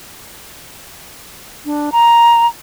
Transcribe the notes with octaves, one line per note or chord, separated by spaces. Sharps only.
D4
A#5